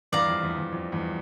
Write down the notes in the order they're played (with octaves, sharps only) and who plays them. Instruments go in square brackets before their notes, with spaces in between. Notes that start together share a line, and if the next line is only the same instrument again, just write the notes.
[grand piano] E2 G2 [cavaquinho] D5 F5 A#5
[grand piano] F2
E2
E2
F2
E2 G2